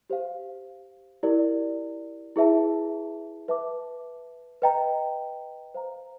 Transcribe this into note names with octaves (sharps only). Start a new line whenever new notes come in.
G4 C5 F5
E4 G4 A#4 D5
E4 G#4 B4 E5 A5
B4 E5 A5 D6
B4 D#5 G5 A#5
C5 F5 A#5